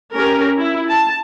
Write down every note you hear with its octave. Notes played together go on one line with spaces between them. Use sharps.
C#4 G4 A#4
E4
A5